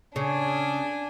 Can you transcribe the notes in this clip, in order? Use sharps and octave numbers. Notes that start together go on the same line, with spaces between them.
C#3 D4 G#5